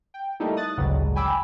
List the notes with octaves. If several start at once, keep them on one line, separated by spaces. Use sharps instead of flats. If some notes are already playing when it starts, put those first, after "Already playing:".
G5
G3 A3 A#3 D#4 E4 A4
D#6 F#6 A6
A1 D2 G2 C#3 F#3 G#3
G5 G#5 B5 D6 E6